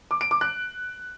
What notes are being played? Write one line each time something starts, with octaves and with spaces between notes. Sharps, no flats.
D6
D7
D6
F#6